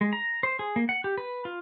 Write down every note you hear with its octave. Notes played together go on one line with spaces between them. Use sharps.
G#3
A#5
C5
G#4
A#3
F#5
G4
B4
F4